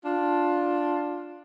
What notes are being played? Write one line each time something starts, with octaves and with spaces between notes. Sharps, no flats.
D4 F4